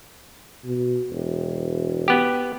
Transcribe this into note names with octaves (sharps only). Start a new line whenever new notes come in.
B2
E1
B3 G4